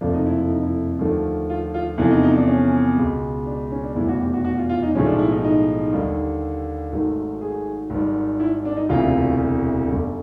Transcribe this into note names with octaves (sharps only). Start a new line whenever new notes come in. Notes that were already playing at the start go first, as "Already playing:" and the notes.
F#1 F2 C3 F3 A3 D4
D#4
E4
E4
D#4
E4
D#2 D3 F3 A3
F4
F4
E2 C3 F3 A3 E4
D#4
D#4
D4
C#4
C#2 B2 G#3
D4
C#4
D4
F1 E2 B2 G3 E4
F#4
G4
F#4
F#4
F4
F4
D#4
B1 A2 F3 G#3 C#4
D4
E4
D#4
D#4
D#2 D3 G3
G#1 G#2 D#3 F#3 A3
G#4
G#1 G#2 D#3 G3
E4
D4
D#4
E1 D2 C3 E3 F4
G1 F#2 D3 G3